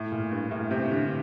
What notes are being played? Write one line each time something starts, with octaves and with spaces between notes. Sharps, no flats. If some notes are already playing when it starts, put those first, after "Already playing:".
Already playing: A2
A#2
G2
A2
C3
D3